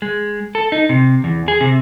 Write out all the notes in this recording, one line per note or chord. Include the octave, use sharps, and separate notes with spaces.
G#3
A4
D#4
C3
E2
G#4
C3